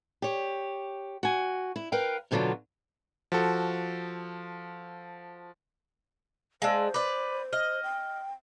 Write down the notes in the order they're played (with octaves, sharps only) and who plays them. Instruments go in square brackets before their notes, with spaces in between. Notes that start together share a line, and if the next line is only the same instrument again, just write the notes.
[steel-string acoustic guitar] G4 C#5
F#4 G#5
E4
A#4 B4 F5 G5
F#2 B2 D3 E3 F#3 F4
[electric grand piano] F3 F#4 A4
[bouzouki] G#3 D4 [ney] C5 [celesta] F5 A5 E6
[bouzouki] B4 D5 [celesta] D6
[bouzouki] D#5 [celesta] F6
[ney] G5